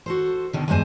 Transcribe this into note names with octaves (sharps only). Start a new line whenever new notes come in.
F#4 A4 C5
B2 D3 D#3
E2 G2 G#3 C5 G#5